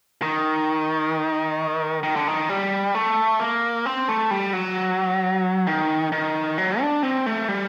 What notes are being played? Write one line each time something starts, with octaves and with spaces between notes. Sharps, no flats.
D#3
D#3
D3
D#3
G3
A3
A#3
C4
A3
G3
F#3
D#3
D#3
F#3
D4
C4
A3
G3